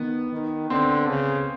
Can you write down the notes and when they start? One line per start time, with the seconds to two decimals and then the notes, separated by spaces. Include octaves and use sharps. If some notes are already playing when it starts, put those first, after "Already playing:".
Already playing: D#3 B3
0.33 D#3
0.70 D3 C4
1.09 C#3